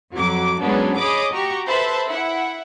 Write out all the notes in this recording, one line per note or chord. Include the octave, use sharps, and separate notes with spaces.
F2 F#3 D6
F#2 F#3 G#3 B3 C#4 D4
G#4 C#5 D#5 B5 D6 D#6
F#4 G4 A#5 C#6
A4 B4 C5 E5 A5 B5
E4 F#5